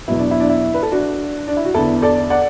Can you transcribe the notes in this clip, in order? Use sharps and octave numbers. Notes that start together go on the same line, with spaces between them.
E2 B2 F#3 B3 E4
D4
E4
D4
E4
B4
A4
D4 F#4
D4
E4
F#4
E2 D3 B3 E4 A4
A4 D5
D5 F#5